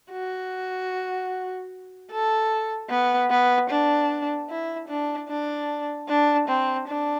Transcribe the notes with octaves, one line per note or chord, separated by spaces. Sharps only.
F#4
A4
B3
B3
D4
E4
D4
D4
D4
C4
D4